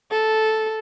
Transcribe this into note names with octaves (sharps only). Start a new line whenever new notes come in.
A4